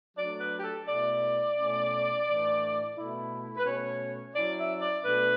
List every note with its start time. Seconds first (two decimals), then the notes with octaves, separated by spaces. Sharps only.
0.17 F#3 A3 D4 D5
0.40 B4
0.59 G4
0.64 A4
0.87 B2 A3 E4 D5
1.57 B2 A3 C#4 E4
2.27 A2 E3 A3 D4
2.96 B2 A3 E4
3.57 B4
3.65 B2 A3 C#4 C#5
4.35 F#3 C#4 E4 D5
4.58 E5
4.81 D5
5.04 B2 A3 D4 B4